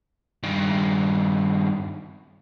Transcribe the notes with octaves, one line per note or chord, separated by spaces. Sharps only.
G2 D#3